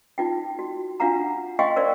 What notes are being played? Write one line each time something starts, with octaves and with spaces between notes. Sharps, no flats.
D#4 F4 G5
F#4
D4 F4 F5 F#5 A#5
D#5 F5 G5 G#5 C6 C#6
A#4 C5 D5 F5